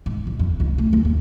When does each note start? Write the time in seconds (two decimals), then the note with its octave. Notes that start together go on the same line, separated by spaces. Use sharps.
0.06 G#2
0.27 A#1
0.39 F2
0.60 C#2
0.78 A3
0.93 D#2
1.05 G2